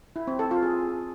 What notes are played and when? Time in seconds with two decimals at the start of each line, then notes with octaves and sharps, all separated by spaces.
0.16 E4
0.27 C4
0.39 A4
0.51 F4
0.63 G#4